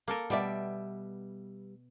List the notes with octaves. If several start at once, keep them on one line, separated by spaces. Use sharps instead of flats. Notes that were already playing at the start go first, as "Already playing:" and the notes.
A#3 A4 A#4
B2 G3 B3 D5 E5